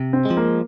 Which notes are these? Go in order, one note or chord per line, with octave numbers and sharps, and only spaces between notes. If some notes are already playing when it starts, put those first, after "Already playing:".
Already playing: C3
C4
G#3
F3
A#3